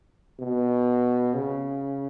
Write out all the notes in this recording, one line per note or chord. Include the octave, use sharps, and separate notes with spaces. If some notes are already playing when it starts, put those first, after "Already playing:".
B2
C#3